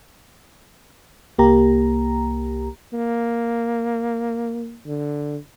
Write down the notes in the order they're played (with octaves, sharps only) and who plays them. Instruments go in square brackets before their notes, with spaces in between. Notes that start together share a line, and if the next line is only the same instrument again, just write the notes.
[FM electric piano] C2 A#3 G4 A#5
[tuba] A#3
D3